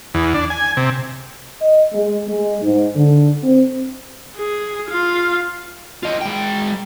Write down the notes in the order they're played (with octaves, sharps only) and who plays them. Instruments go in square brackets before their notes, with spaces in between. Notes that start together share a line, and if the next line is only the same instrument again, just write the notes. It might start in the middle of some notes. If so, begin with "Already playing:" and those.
[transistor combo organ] E2
D4
G#5
C3
[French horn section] D#5
G#3
G#3
G#2
D3
C4
[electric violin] G#4
F4 F5
[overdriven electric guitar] F4 D#5
G#3 G5